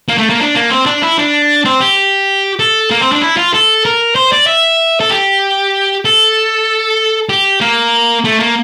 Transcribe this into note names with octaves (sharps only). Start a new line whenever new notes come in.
A#3
A3
A#3
D4
A#3
C4
D4
E4
D4
C4
G4
A4
A#3
C4
D4
E4
F4
A4
A#4
C5
D5
E5
A4
G4
A4
G4
A#3
A3
A#3